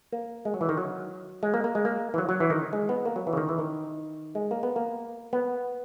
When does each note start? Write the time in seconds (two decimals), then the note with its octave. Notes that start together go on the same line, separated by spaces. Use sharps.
0.13 A#3
0.45 G#3
0.54 F#3
0.61 E3
0.69 D#3
0.77 F#3
1.43 G#3
1.54 A#3
1.64 A#3
1.75 G#3
1.85 A#3
2.14 E3
2.18 F#3
2.29 F#3
2.40 E3
2.50 D#3
2.73 G#3
2.89 B3
3.05 A#3
3.16 F#3
3.27 E3
3.33 C#3
3.37 D#3
3.49 E3
3.59 D#3
4.35 G#3
4.51 A#3
4.63 B3
4.76 A#3
5.33 B3